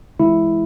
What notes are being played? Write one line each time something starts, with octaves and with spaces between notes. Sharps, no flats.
E3 G#3 E4